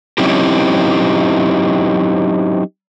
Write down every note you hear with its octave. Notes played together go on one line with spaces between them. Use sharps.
F#3 C4 C#4 D#4 E4 G4